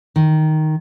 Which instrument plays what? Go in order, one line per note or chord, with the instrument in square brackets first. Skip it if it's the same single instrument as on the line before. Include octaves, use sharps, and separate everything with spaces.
[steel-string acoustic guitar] D#3